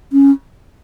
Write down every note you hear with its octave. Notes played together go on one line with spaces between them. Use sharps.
C#4